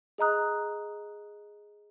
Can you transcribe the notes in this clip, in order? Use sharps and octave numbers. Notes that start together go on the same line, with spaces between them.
G#4 D#5 A#5 D#6 F#6